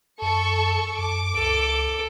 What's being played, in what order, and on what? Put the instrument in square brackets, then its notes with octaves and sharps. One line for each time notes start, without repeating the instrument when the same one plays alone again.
[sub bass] F#2 [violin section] A4 C#6
[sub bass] F#2 [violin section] D6
[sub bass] C#2 [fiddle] A4